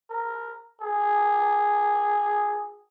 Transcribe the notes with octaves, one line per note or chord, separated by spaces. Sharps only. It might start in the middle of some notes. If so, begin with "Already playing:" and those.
A#4
G#4